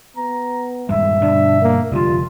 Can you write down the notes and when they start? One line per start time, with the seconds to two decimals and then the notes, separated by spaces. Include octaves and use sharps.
0.17 B3 A#5
0.89 D#1 G2 G#3 E5
1.21 G2 B2 D3 D4
1.62 A#3
1.91 F1 B2 D3 G3 F4